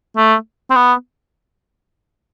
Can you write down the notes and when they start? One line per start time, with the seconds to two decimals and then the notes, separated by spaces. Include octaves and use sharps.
0.17 A3
0.70 C4
0.75 B3